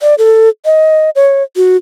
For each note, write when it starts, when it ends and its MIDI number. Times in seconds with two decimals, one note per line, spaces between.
0.01 0.15 74
0.18 0.49 69
0.65 1.10 75
1.15 1.43 73
1.56 1.77 66